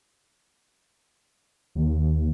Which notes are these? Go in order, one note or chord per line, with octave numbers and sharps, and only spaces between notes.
D#2